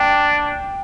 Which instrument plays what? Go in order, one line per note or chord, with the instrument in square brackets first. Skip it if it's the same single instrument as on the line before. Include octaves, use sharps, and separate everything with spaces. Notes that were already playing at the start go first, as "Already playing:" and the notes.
Already playing: [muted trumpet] D4 [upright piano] G5